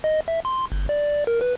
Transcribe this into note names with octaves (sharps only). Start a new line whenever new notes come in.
D#5
E5
C6
G1
D5
A#4
B4